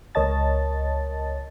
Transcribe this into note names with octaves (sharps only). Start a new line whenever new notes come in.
C#2 A#4 C#5 D#5 A5 A6